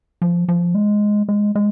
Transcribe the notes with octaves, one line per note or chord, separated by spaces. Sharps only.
F3
F3
G#3
G#3
G#3